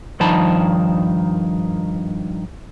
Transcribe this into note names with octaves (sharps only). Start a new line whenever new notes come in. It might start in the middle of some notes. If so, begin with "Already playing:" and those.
G2 D#3 F3 D#4 A5 B5